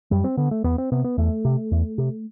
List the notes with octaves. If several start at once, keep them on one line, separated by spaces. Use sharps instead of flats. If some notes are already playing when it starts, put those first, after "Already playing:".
F#2 G3
C4
D3 B3
A3
E2 B3
C4
C3 B3
B3
E2 A3
C3
E2
C3